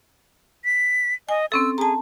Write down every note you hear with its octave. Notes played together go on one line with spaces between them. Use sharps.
B6
D#5 G#5
C4 C#4 A4 E6
G#4 A5 A#5